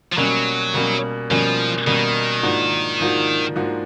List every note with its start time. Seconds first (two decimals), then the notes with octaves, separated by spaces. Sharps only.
0.13 F3
0.17 B2 F#3 G3 A#3 C#4
0.74 B2 G3 A#3 C#4
1.31 B2 F3 G3 A#3 C#4
1.87 B2 D#3 G3 A#3 C#4
2.43 G#2 F3 A#3 D4 F#4
3.00 G#2 F3 A#3 D4 F#4
3.55 G#2 F3 A#3 D4 F#4